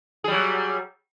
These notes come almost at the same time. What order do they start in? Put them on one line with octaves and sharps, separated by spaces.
G#4 G3 F#3